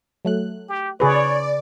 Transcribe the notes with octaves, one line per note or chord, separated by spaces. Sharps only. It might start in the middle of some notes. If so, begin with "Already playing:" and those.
F#3 A3 F#6
G4
C#3 G#4 B4 C#5 D5